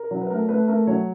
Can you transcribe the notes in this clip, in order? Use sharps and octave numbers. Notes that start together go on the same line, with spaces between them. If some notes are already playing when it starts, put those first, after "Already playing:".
Already playing: A#4
F#3
B4
A3 A#4
A3 B4
A3 A#4
F#3 C#5